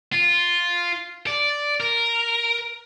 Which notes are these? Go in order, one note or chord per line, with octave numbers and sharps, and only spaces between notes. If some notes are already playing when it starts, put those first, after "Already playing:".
F4
D5
A#4